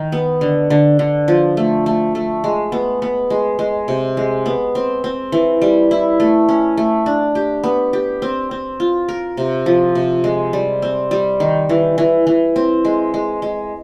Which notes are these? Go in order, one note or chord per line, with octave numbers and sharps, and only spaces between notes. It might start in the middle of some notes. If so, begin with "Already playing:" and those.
Already playing: D#3
B3
D3
D3
D3
F3
A3
A3
A3
G#3
B3
B3
G#3
G#3
C3
G#3
B3
C4
C4
E3
G3
E4
A3
C#4
A3
D4
G4
B3
G4
C4
C4
F4
A#4
C3
F3
C3
G#3
G3
C4
G3
D#3
E3
E3
E3
C4
G#3
G#3
G#3